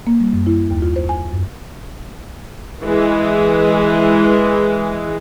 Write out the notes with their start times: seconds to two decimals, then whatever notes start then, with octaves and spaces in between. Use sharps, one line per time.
0.07 A#3
0.21 G3
0.33 F#2
0.47 E4
0.71 D#2
0.82 F4
0.96 C5
1.09 G#5
1.32 F#2
2.83 E3 G#3